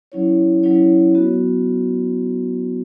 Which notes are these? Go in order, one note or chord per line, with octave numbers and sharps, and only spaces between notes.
F#3 C#4 E4 C#5
F#3 C#4 E4 C#5
F#3 B3 F#4